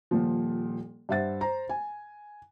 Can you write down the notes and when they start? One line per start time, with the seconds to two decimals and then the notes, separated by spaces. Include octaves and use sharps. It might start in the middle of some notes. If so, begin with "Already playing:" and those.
0.11 D#1 A#2 F3
1.09 G2 C5 E5 F#5 A6
1.41 C5 A#5
1.69 G#5